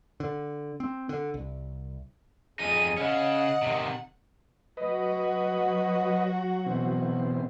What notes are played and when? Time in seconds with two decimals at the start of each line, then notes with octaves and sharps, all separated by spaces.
0.20 D3
0.80 C4
1.09 D3
1.34 C2
2.59 F2 D#4 G#4 D#7
2.97 C#3 C#4 D#5 F#5
3.62 C3 D#3
4.77 F#3 F#4 B4 D#5
6.66 B2 E3 C4